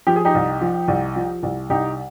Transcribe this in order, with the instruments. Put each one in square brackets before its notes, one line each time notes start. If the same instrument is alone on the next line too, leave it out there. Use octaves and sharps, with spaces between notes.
[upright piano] F3 G4
G#4
D#4 G4
C2
F3
C2
F3
C2
C2 D#4 G4